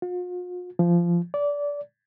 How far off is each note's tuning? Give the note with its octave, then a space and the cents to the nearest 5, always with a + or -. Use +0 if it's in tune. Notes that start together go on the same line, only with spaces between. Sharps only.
F4 +45
F3 -20
D5 -20